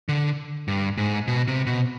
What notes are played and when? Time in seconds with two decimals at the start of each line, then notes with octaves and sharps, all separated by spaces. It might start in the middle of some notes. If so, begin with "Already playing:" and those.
0.09 D3
0.68 G2
0.98 G#2
1.28 B2
1.48 C3
1.67 B2